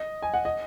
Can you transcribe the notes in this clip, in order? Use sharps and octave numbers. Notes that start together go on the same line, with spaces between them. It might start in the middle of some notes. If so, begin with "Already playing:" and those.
Already playing: D#5
G#5
F#5
D#5